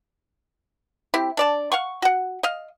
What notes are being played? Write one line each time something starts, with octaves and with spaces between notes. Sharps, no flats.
C4 E4 G4
D4 D5 A5
F5 F#5 C#6
F#4 F#5
D#5 F5